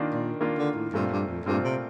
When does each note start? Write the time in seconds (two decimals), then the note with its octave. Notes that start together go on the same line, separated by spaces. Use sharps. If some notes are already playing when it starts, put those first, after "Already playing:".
Already playing: D#3 A#3 D4 F4
0.14 A#2
0.40 D#3 A#3 D4 F4
0.58 D3
0.76 A2
0.93 G2 A#2 A3 C4 F4
1.11 G2
1.28 F2
1.46 G2 A#2 A3 C4 F4
1.64 C3